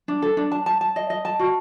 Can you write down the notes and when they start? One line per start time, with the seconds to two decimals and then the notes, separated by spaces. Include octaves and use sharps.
0.08 D4
0.22 A4
0.37 D4
0.51 A5
0.66 A5
0.81 A5
0.96 D#5
1.10 D#5
1.25 A5
1.39 F#4